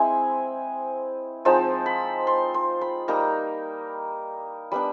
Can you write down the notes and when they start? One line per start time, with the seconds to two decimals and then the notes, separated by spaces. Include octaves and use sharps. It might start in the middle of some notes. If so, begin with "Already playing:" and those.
Already playing: G#3 C4 E4 G#5
1.45 F3 G#3 C4 D#4 A5
1.86 B5
2.27 C6
2.54 C6
2.81 B5
3.08 G3 A#3 D#4 A#5
4.72 G3 B3 D4 B5